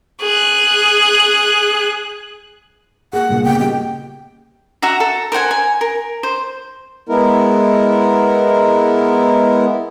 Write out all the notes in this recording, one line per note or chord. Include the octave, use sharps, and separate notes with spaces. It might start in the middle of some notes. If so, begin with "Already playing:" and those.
G#4 F#6
A#3 G#4 F#5
G2 A#2
C#3 A#3 B3 G5
G3 G4 D#5 G5
F#4 E5 F#5 A#5
A4
A#4 C5 F#5 G#5
G#5
A#4
C5
G#3 B3 E4 A#4